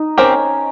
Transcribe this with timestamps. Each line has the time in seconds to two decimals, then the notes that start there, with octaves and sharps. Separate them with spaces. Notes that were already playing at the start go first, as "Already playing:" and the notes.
Already playing: D#4
0.18 C4 C#4 G4 A#4